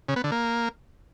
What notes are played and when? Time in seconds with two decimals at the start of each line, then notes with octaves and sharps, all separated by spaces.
0.09 C#3
0.16 B3
0.24 D3
0.32 A#3